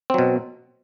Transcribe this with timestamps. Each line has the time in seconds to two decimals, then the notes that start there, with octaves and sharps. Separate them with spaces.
0.10 C4
0.14 F#3
0.18 B2